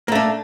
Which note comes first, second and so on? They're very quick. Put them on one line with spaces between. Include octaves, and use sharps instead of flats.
A#3 A3 D4